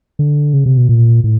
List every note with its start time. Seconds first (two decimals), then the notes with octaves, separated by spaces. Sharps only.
0.19 D3
0.53 C#3
0.66 C3
0.77 B2
0.89 A#2
1.24 A2